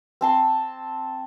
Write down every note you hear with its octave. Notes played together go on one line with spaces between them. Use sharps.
C4 A5 C6